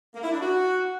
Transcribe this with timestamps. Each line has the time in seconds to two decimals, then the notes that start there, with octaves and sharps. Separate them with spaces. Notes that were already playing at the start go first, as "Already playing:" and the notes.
0.15 A#3
0.23 E4
0.32 D4
0.41 F#4